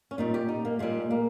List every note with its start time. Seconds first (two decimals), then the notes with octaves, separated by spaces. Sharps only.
0.11 C#4
0.18 A#2 G3 D#4
0.34 G4
0.48 D#4
0.65 A#3
0.79 A#2 G3 G#3
1.11 A#3